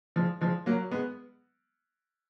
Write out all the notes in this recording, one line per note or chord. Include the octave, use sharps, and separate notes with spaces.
F3 G#3
F3 G#3
F#3 A#3
G#3 B3